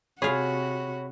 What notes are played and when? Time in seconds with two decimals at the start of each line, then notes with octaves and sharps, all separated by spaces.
0.22 C3 F4 F#4 G#4 C#5 B5